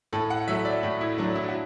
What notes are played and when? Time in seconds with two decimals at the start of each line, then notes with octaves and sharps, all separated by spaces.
0.13 A2 A4
0.30 F#5
0.48 F#3 A3 E5
0.65 D5
0.83 A2
1.01 E4
1.18 F#3 A3 D4
1.35 E4
1.48 F#4